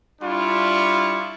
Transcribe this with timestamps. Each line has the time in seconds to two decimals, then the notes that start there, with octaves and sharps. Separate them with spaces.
0.21 G3 D4 E4 F4 C#6